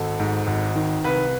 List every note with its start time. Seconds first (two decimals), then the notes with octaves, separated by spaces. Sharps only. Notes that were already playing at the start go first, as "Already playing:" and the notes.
Already playing: G#1 A4
0.20 G#2
0.47 G#1
0.75 D#3
1.04 C2 B4